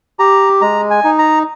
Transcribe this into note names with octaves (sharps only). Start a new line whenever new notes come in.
G4 A#5
G#3 A#5
G#5
D#4
A#5